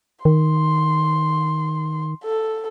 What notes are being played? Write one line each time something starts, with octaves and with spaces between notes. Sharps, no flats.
D#3 C6
A4